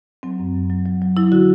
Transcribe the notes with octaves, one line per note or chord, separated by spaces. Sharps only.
F#3 C4
F#2
F#2
F#3
F#3
F#3
F#3 E4
D3 F#4